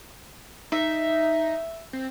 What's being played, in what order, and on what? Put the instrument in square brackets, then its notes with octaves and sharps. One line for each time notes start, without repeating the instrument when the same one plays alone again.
[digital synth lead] D#4 [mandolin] E5
[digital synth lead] C4